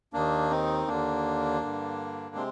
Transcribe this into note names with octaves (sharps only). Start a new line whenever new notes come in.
D#2 D#3 A#3 D4
C4 D#4
D#2 D3 A#3 D4
G2 D3
C3 G#3 C4